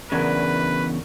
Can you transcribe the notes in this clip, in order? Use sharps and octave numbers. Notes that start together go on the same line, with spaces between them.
E2 C#3 F#3 D4 A#4 B4